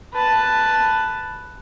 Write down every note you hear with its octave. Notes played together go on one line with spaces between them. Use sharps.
B4 A5